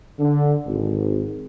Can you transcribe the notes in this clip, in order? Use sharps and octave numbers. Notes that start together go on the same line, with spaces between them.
D3
G#1